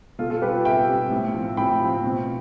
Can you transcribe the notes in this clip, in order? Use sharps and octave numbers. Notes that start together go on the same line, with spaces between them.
B2 F4 A4
F4 A4
G3 C4 G4 B4
B2 E5 G5
G3 C4
A2
F3 C4
A2 G5 B5
F3 C4
B2